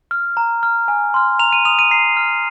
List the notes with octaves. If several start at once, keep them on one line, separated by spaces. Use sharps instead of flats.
F6
A#5
F6
G#5
C6 F6
A#5 F7
D#7
D#6 F7
D#7
A#5 C7
F6